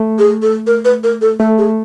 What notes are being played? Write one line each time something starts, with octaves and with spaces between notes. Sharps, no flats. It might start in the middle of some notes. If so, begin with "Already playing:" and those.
Already playing: A3
G#4
A4
A#4
B4
A#4
A4
A3 A4
G#4